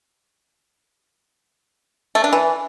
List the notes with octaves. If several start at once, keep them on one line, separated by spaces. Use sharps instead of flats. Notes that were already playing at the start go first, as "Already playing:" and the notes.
A3
D4
E3